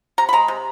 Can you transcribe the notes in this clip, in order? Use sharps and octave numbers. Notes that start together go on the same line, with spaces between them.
C3 A#5
B5
G#3 A#5
C3